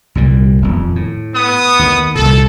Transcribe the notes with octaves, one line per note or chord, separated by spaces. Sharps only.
C2 A#2 G3
D#1 F2
A2
B3 D#6
D#2 D#3
C2 A#2 A4